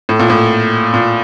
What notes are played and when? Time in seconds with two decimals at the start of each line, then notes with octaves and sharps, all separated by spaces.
0.09 A2
0.19 A#2
0.30 A2
0.94 A#2